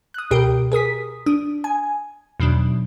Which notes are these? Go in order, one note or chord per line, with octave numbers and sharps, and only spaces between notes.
D#6 F#6
C#2 B2 G4 A#4 G5 D7
G#4 A#4 D#6 B6
D4 D#6
G#5
E2 B2 D#3 F#3 D4